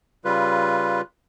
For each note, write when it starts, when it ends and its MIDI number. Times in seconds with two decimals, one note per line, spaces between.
0.25 1.01 49
0.25 1.01 55
0.25 1.01 65
0.25 1.01 71